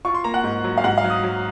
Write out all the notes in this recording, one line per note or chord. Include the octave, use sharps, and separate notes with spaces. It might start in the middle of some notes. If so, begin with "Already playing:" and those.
F4 C#6
C6
A#3 A#5
F#5
G#2
F#3
F5
G#2 F#5
F5
F#3
D#6
F#3